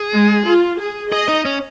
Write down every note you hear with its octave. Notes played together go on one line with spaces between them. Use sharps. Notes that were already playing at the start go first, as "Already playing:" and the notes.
Already playing: G#4
G#3
F4
G#4
G#4 D#5
D#4
C#4